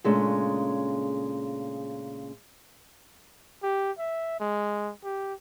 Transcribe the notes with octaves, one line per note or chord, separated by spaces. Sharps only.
A#2 C#3 G#3 A3 C#4 D4
G4
E5
G#3
G4